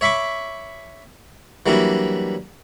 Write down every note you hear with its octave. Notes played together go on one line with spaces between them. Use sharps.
C#5 E5 B5 C#6 D6
E3 F#3 G3 A#3 D4 E4